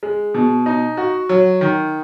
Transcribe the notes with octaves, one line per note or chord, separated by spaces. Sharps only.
G#3
B2
D#4
F#4
F#3
D#3